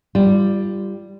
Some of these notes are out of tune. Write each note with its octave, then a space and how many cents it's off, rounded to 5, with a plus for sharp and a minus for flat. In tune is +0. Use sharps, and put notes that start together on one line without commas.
G3 +0 F4 -30